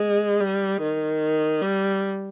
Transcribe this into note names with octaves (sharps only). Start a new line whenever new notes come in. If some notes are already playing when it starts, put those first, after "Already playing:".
Already playing: G#3
G3
D#3
G3